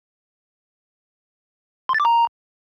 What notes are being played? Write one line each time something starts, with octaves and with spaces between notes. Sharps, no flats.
C6
A6
D6
A#5